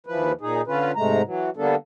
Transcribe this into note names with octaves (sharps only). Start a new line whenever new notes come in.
D#2 E3 F3 B4
A#2 D#4 G#4
D3 C#4 F4 B4
G#2 C3 G#3 A3 A#5
E3 F#3
D3 G3 A#3 B3 D4 A4